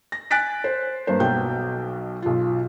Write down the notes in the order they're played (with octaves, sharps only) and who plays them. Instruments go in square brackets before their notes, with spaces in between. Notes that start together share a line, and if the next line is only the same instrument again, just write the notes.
[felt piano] A#6
G#5 F#6 A6 B6 D7
C5
G2 A#3 C5
B1 B2 F#3 G5 G6
B1 F4